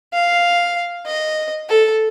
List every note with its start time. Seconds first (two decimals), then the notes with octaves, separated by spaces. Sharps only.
0.13 F5
1.06 D#5
1.69 A4